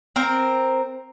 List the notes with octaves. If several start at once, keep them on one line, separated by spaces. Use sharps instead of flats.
C4 A#4